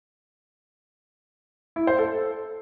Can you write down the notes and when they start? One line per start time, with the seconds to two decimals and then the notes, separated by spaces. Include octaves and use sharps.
1.76 E4
1.87 C5
1.99 A4